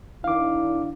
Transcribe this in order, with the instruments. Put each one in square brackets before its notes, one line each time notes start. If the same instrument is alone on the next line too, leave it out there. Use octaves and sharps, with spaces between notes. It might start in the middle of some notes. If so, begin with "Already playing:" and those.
[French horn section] D#3 D4 E4 [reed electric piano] F5 D6